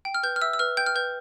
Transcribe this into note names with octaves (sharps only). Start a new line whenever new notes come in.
G5
F6
B4 G6
F6
E5 E6
E6
B4 F6
G5 G6
F6
B4 G6